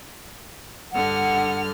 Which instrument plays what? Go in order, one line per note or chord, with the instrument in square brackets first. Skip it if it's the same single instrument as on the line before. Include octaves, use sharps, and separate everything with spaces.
[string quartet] G2 D3 F6 [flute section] F#5